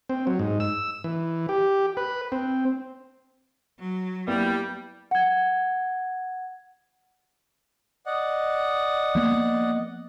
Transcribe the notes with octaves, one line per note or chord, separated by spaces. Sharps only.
C4
F#3
G#2
E6
E3
G4
B4
C4
F#3
G3 A#3 B3 E4
F#5 G#6
D5 D#5 F#5
F3 A#3 B3